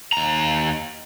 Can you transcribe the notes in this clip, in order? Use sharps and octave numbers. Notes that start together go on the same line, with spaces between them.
D#2 A#5